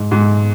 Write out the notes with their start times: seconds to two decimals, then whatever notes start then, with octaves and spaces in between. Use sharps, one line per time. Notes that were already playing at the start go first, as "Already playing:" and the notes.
Already playing: G#2
0.11 G#2